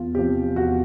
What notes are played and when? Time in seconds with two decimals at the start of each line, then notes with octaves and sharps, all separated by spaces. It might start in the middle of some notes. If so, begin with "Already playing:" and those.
Already playing: E2 F4
0.15 C3 F3 G4
0.56 E2 F#4